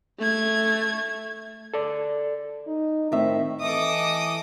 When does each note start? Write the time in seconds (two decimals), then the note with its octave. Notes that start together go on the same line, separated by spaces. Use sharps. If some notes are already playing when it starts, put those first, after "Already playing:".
0.19 A3 G#6
1.74 A4 D5
2.67 D#4
3.12 A2 D#3 C4 E5
3.61 E3 A4 D#5 D6 D#6